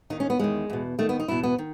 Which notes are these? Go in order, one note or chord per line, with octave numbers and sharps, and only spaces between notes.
D#2 D#3 D#4
C#4
B3
E2 D#3 G#3
E2 B2
D#2 D#3 A3
B3
D#4
E2 B2 E4
B3
D#3